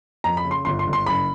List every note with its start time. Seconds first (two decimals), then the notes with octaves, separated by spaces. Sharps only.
0.24 F2 A#5
0.37 B5
0.45 C#3
0.51 C6
0.65 G1 C6
0.79 C6
0.87 G1
0.93 C6
1.06 F#1 B5